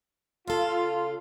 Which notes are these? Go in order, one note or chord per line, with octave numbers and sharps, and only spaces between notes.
C#3 F4 A4